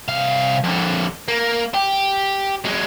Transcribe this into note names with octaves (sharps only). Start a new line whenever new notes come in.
C2 F5
F2 D3
A#3
G4
F#3 G#3